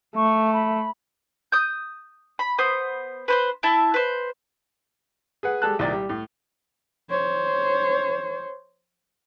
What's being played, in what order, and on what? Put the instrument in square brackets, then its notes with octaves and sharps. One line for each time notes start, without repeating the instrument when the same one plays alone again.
[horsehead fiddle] A3 [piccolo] C#6
[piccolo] B5
[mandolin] D#6 G6
B5
B3 C5 D#6
B4 C5 C6
E4 E5 A5
B4 C5
[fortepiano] G#4 B4 F#5
G3 G#3 A4 A5 F#6
C2 A#2 D#3 D5
G3
A2
[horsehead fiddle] C5 C#5